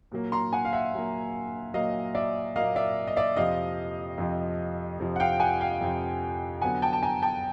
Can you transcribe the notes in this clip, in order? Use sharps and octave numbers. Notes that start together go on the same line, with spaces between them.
A#2 F#3 A#3
A#5 C6
F#5 G#5
F5
E5 F#5
A#2 F#3 A#3
A#2 F#3 A#3 D#5 F5
D5 E5
A#2 F#3 A#3 D#5 F5
D5 E5
D#5
D5 E5
F2 C3 F3 D#5 F5
F2 C3 F3
F2 C3 F3
F#5
F5 G5
F#5 G#5
F5 G5
F2 C3 F3
D3 F#3 B3 F#5 G#5
G5 A5
A5
G#5 A#5
G5 A5